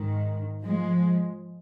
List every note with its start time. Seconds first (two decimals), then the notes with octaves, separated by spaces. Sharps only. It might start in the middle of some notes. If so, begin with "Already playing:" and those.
Already playing: G#2 D#3
0.63 F3 G#3